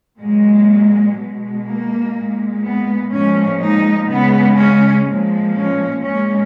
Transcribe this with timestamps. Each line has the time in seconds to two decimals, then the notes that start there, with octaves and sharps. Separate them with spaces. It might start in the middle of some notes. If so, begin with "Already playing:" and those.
0.19 A#2 F#3 G#3
1.16 B2 G#3
1.65 A#3
2.14 A#2 G#3
2.63 B3
3.11 A#2 F3 G#3 C#4
3.59 D#4
4.08 C#3 G#3 B3
4.57 C#4
5.05 A#2 F3 G#3
5.54 C#4
6.02 A#2 G#3 C#4